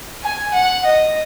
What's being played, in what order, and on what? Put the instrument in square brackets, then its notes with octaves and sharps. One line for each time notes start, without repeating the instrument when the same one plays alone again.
[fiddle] G#5
F#5
D#5